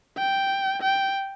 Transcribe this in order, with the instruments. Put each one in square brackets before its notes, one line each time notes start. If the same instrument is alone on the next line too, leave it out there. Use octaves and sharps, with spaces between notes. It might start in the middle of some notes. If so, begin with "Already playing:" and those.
[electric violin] G5
G5